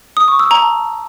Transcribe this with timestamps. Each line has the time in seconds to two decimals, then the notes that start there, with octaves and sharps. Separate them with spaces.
0.17 D#6
0.28 C#6
0.39 E6
0.51 A#5
0.62 A5